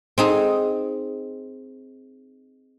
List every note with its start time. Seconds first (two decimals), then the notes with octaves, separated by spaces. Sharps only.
0.18 C4 D#4 G#4